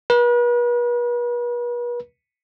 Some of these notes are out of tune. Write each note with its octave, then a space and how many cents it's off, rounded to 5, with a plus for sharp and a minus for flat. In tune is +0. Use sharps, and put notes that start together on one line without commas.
B4 -40